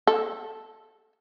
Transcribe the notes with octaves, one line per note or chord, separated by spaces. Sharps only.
A4